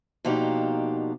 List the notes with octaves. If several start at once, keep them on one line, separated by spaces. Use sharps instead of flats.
B2 F3 A#3 D4 D#4 G4